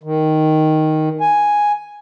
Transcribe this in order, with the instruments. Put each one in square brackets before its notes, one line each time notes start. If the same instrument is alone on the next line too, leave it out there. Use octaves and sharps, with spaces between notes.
[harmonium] D#3
G#5